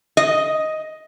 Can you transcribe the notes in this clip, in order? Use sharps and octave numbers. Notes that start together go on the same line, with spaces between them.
D#5